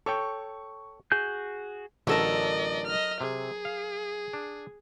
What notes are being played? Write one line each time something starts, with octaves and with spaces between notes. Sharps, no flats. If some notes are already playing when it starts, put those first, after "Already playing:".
A4 C#5 G5 C#6
F#4 G#4 G#5 G6
A1 D3 F#3 A4 A#4 D5 D#5
D#5 F6
C3 G#4
F5
D4